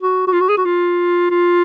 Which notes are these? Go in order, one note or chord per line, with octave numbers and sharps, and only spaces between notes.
F#4
F#4
F4
F#4
G#4
F#4
F4
F4